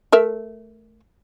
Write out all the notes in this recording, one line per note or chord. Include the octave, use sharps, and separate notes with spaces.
A3 A#4 E5